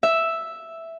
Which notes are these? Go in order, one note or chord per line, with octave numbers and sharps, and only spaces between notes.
E5